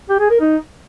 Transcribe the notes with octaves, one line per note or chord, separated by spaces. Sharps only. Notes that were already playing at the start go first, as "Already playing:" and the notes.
G4
G#4
A#4
D#4